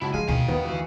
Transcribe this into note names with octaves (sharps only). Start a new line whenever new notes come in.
C#2 F#3 E4 A5
D#3 F3 G#3 F5 G#5
D2 B2 D#3 F5 G#5
D#2 D#3 B3
D2 D#3 E3